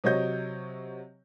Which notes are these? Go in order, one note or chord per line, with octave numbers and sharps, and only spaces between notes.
C3 F#3 C#5 D#5 G6